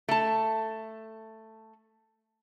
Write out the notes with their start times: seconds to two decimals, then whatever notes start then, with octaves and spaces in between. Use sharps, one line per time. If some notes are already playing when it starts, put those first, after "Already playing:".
0.09 A3 A5